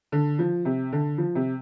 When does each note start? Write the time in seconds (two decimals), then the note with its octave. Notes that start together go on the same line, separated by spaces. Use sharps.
0.12 D3
0.39 F3
0.65 C3
0.92 D3
1.18 F3
1.35 C3